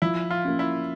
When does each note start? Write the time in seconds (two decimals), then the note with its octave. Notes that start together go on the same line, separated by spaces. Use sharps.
0.02 F3 E4
0.30 F4
0.45 A#3 C#4
0.59 E4